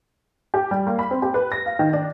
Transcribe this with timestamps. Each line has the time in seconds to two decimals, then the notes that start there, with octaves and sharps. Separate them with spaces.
0.54 G4
0.71 G3
0.87 A#3
0.99 B5
1.11 C4
1.22 G4
1.34 B4
1.52 A#6
1.66 F5
1.79 D#3
1.93 D4